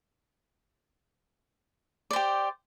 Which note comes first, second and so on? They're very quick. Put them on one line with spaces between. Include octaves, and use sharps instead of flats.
D5 C5 G4